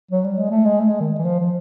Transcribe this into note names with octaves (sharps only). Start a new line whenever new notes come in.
F#3
G3
G#3
A3
G#3
A3
G#3
D#3
E3
F3
F3